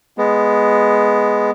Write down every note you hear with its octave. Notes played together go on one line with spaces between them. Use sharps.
G#3 B3